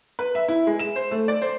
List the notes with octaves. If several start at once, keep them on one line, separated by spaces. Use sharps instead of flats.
B4
E5
E4
G#3
E7
C5
A3
D5
C5